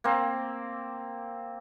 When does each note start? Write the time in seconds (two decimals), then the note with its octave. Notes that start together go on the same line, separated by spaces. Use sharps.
0.04 A#3 C4